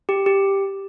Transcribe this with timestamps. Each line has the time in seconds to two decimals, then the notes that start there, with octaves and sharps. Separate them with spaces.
0.09 G4
0.26 G4